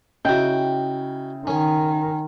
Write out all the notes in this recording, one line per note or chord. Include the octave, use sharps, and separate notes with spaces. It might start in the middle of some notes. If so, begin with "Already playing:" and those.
C#3 D#4 E4 F#4 G5
D#3 C#4 G#5